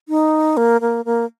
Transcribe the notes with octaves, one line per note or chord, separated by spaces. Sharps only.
D#4
A#3
A#3
A#3